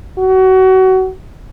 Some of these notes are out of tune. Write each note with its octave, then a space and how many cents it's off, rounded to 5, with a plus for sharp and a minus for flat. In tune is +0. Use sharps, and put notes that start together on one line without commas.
F#4 +25